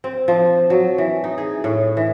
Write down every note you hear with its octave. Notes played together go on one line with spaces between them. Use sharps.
C4
F3
F#3
E3
D#4
G#4
A2
E3